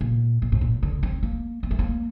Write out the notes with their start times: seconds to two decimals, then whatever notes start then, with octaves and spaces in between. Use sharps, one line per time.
0.01 A#2
0.42 A#2
0.52 A2
0.61 A#2
0.83 D3
1.03 C4
1.23 A#3
1.63 A#3
1.71 A3
1.79 A#3